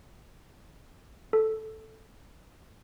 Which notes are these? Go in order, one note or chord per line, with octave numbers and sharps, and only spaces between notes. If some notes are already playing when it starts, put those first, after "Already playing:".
A4